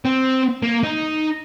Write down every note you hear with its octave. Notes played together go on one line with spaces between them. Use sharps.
C4
A#3
D#4